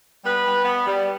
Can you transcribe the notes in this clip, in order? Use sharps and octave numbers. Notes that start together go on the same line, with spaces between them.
G3 B3 B4
G3
B3
G3